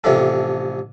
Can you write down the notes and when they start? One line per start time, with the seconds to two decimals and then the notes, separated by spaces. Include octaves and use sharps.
0.04 A1 C3 F3 D4 A4